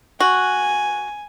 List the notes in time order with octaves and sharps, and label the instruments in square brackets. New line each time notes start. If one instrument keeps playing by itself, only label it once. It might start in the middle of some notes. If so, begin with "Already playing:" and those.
[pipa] F#4 [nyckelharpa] G#5